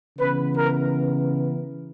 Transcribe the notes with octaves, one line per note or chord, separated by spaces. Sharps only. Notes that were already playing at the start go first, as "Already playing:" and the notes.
C#3 E3 B3 B4
A#4